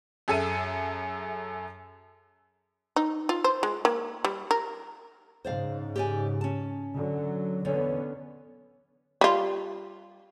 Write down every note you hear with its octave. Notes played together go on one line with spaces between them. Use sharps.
F#2 G#4 A4 E5 D#7
D#4
F4
C5
G#3
A#3
G3
A#4
G#2 C#3 C5 D5 F5
G4 D5 G#5
C#4 A5
D3 F#3
E2 D3 B3 C#4 C#5
G3 F4